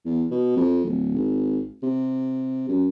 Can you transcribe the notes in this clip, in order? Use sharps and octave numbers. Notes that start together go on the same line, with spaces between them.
E2
B2
F2
D1
G#1
C3
F#2